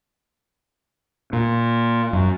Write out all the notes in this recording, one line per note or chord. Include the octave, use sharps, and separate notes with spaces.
A#2
F#2